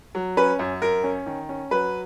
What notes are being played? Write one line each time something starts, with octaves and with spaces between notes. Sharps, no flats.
F#3
C#4 B4
F#2
F#2 A#4
C#4
D#3
C#4
F#3 B4